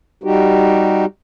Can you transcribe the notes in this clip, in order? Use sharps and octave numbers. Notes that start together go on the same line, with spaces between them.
G3 D#4 F#4 G4